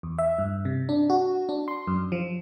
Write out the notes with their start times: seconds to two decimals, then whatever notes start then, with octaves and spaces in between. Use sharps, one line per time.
0.03 E2
0.19 E5
0.39 G2
0.65 C3
0.89 D4
1.10 F#4
1.49 D4
1.68 C6
1.87 F#2
2.12 F3